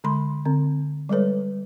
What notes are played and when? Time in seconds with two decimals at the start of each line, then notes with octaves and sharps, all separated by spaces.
0.04 D3 G#3 B5 C6
0.45 D3 C4
1.09 G3 G#3 A4 B4 C#5